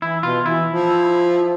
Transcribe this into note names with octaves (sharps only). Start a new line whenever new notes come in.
E3 E4
B2 F4
E3 E4
F3